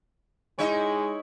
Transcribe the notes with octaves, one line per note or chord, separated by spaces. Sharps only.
G#3 D#4 E4 C#5